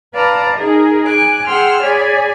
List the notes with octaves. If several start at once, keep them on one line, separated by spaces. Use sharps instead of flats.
B4 D5 F5 A5 A#5
D#4 G#4 A#4
G#5 D6 F#6
G#4 F#5 G5 C6 E6 F6
G#4 C#5 D5 G#5 B5